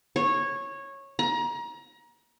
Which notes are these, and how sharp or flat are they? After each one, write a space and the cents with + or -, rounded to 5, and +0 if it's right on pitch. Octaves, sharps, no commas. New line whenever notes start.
C#5 -15
A#5 +30